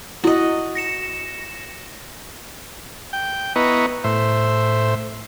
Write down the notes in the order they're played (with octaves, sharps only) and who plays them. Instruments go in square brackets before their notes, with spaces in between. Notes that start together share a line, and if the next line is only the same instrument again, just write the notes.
[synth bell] E4 [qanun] F#4 D#5
[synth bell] A#6 C#7 E7
[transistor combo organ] G5
B3 E4 B4 D#5 A#5 C#6
A2 C5 E5